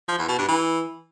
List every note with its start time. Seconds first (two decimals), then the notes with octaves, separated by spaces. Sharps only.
0.08 F3
0.18 E2
0.28 B2
0.38 G2
0.49 E3